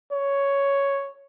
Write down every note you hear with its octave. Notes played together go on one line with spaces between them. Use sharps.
C#5